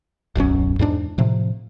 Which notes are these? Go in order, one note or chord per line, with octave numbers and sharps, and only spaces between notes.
D1 B1 F#2 C#4
E2 G#2 G#3 D4
A2 C3 F3